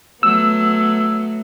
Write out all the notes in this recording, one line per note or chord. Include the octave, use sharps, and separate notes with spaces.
F#3 A3 B3 E6